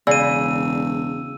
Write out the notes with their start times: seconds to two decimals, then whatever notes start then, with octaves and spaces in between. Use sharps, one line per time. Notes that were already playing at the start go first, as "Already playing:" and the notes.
0.07 E1 C#3 D5 E6 D#7